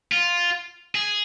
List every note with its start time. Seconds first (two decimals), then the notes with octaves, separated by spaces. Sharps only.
0.12 F4
0.95 G#4